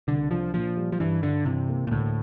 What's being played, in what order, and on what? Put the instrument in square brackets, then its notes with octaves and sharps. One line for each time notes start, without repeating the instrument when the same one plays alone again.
[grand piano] C2 [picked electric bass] D3
[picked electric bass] F3 [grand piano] D4
[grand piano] A#2 [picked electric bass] F3
[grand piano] G3
[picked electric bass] F3
[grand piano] G2 [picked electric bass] E3
[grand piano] G2 [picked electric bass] D3
[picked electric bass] C3 [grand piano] E3
[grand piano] A#3
[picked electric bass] A#2
[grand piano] D2 [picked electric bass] A2